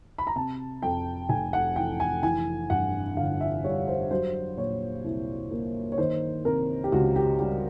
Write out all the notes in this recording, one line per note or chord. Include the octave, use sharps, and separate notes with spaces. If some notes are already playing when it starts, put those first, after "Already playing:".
B5
A#5
C3 A5
F2 G5
F1 G#5
F#5
E3 G5
G#5
E3 G#5
G2 F#5
G1 F5
E5
G3 C#5
C5
F#3 C5
A#2 C#5
C2
A#3
C#5
D#3 C5
C3 A#4
G4
C#2 F#4
G4
G3 G4